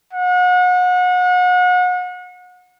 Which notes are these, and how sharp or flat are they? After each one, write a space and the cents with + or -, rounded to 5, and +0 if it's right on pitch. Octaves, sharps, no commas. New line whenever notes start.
F#5 -35